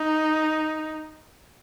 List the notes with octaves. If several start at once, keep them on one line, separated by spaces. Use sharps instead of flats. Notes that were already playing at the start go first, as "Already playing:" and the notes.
Already playing: D#4